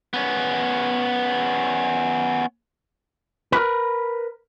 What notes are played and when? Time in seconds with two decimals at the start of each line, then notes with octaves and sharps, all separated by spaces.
0.14 B3 C#4
3.52 A#4 B4